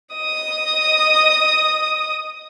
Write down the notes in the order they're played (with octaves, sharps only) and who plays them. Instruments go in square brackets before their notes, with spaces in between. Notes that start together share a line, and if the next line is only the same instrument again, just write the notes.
[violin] D#5 D#6